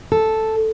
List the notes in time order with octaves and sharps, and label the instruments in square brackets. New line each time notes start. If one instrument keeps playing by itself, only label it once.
[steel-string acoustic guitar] A4